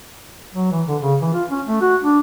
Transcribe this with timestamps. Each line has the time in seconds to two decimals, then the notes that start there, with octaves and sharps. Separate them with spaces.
0.55 F#3
0.72 E3
0.88 D3
1.02 C#3
1.22 E3
1.34 F4
1.51 C#4
1.67 A3
1.81 F#4
2.03 D4